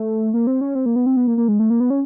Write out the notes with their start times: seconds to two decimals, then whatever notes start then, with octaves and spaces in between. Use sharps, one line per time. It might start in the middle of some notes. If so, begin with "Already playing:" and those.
Already playing: A3
0.34 A#3
0.47 C4
0.61 C#4
0.75 C4
0.86 A#3
0.96 B3
1.06 C4
1.17 B3
1.27 A#3
1.38 A#3
1.48 G#3
1.59 A3
1.70 A#3
1.80 B3
1.90 C#4